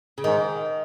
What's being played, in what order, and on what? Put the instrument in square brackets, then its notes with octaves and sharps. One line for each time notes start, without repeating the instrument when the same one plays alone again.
[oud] C#3
[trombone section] G#2 [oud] D#3